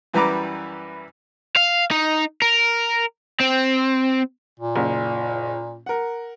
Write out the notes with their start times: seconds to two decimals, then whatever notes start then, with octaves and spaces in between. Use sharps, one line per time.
0.14 F#2 E3 G3 B4 A#5 D6
1.57 F5
1.91 D#4
2.42 A#4
3.41 C4
4.60 A#2
4.76 F#1
5.86 A#4 F#5